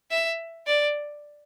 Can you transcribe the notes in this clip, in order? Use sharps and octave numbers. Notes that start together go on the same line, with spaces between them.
E5
D5